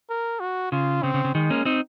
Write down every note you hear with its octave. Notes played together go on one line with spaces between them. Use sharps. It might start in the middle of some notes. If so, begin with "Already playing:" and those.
A#4
F#4
C#3 F4
C#3 C4
C#3
C#3
D#3 G#3
A#3 C#4
C4 D#4